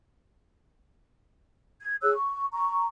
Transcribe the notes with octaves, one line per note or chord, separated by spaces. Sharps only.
G#6
G#4 C#5 E6 F#6
C#6
A#5 C#6